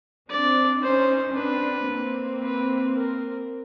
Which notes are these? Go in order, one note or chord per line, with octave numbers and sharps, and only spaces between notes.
C4 D4 D5
C#4 D#4 C5
C4 D4 B4
A#3 C4
B4
A#4